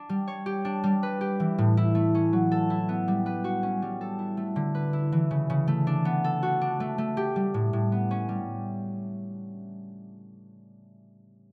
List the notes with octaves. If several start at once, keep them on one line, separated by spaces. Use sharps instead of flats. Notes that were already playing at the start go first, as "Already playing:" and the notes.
Already playing: D4
G3
C#5
G4
D4
G3
B4
G4
E3
A2
E4
A3
C#4
F#3
A4
E4
B3
G3
B4
F#4
C#4
G3
A4
E4
A3
D3
B4
E4
E3
C#3
C#3
A3
D4
B3
A4
F#4
D4
A3
A3
G4
G3
A2
A2
B3
C#4
G3